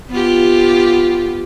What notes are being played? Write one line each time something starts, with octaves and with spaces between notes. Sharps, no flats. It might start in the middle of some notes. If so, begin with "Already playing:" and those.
B3 F4 G4